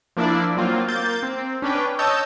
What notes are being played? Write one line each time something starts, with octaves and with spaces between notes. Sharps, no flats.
F3 A#3 D4 E4 D5
F#3 A#3 C4 F4
A#3 G6 A6
C4
C#4 D4 B4 G5
C#5 D#5 A5 E6 G6